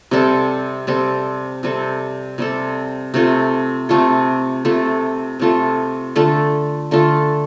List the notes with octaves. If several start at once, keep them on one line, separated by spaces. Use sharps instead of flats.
C3 G3 C4 A4
C3 G3 C4 A4
C3 G3 C4 A4
C3 G3 C4 A4
C3 A3 F4 A4
C3 A3 F4 A4
C3 A3 F4 A4
C3 A3 F4 A4
D3 A3 F4 A4
D3 A3 F4 A4